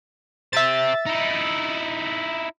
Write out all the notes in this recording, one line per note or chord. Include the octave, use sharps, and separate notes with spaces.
G4 C5 E5 A6
D#4 E4